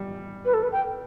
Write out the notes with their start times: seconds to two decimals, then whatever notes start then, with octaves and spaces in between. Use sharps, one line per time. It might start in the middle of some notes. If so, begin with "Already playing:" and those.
Already playing: G3
0.45 B4
0.54 A4
0.63 B4
0.72 G5